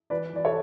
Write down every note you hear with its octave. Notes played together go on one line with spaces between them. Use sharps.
E3 B4 D5
E3 D5
A4 C#5